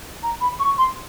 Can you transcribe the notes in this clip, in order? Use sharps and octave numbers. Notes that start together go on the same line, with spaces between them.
A#5
B5
C#6
C6